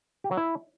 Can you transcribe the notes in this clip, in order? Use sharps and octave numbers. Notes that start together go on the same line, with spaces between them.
G4
F#3
E4